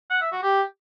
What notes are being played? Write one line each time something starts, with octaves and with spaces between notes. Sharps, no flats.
F#5
E5
F#4
G4